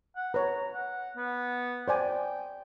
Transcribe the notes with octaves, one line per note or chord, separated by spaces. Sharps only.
F#5
B4 C#5 A#5
F#5
B3
C5 D5 G5 G#5